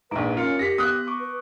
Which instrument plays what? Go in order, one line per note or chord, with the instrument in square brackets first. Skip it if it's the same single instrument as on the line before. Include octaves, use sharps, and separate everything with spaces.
[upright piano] A#1 G#2 [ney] B4 [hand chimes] A#5 D6 D7
[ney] C#4 [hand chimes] D#4 A#4 C#7 [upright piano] F4
[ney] G4 [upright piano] A#6 B6
[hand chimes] B3 [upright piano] D#6 F#6
[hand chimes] C#6 D6
[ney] B4